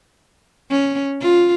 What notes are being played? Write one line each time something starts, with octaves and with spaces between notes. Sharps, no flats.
C#4
F4